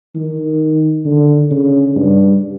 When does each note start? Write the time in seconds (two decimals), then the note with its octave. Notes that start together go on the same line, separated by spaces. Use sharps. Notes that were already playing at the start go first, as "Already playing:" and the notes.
0.15 D#3
1.05 D3
1.51 C#3
1.96 G2